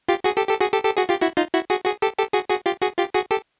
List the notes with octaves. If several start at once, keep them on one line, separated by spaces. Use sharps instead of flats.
F4 G4
F#4 G#4
G4 A4
G4 A4
F#4 G#4
G4 A4
G4 A4
F#4 G#4
F4 G4
E4 F#4
D#4 F4
E4 F#4
F#4 G#4
F#4 G#4
G4 A4
G4 A4
F#4 G#4
F#4 G#4
F4 G4
F#4 G#4
F4 G4
F#4 G#4
G4 A4